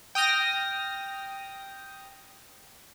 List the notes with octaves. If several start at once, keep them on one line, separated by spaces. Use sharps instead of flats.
G5 D#6 F6 A#6